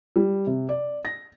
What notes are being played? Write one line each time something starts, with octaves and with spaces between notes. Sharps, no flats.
G3
C3
D5
A#6